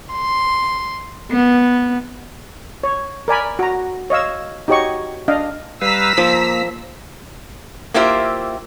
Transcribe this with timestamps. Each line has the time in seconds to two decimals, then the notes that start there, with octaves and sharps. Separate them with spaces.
0.11 C6
1.31 B3
2.84 C#5
3.28 A#4 D5 G#5 B5
3.59 F#4 A#5
4.10 C#5 D#5 F5 E6
4.68 D#4 F#4 G4 C#5 D#5 C#6
5.28 D4 D#5 F5
5.82 G3 B4 F5 A#5 E6 B6
6.17 F3 A#3
7.94 A#3 E4 F4 G4 C5 E5